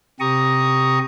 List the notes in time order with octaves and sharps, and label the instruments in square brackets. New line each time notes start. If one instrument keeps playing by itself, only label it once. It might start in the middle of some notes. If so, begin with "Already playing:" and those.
[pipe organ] C3 G4 A#5 C#6 D#6